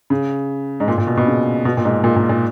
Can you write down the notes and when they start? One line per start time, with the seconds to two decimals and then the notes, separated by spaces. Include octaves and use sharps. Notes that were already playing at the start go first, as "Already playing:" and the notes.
0.10 C#3
0.80 G#2
0.88 A#2
0.98 A#2
1.07 B2
1.17 B2
1.27 C#3
1.65 B2
1.77 A#2
1.85 G#2
2.04 A#2
2.16 A#2
2.29 A#2